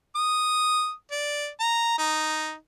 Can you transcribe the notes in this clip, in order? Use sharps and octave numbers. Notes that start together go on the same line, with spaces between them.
D#6
D5
A#5
D#4